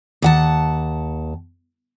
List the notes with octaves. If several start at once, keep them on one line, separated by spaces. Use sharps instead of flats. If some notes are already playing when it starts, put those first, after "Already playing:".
D#2 F#5 A5